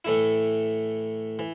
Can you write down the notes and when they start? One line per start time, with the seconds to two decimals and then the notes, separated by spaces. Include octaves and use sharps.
0.05 A2 E3 A3 E4
1.39 E3